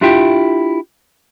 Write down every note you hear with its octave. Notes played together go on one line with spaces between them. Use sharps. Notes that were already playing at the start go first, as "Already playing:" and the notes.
D4 E4 F4 G4 E5 G5